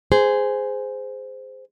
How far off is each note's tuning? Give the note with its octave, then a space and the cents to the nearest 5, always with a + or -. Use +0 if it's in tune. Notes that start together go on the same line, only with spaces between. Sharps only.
G#4 +0 C5 -15